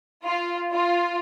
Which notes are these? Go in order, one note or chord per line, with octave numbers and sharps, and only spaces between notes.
F4
F4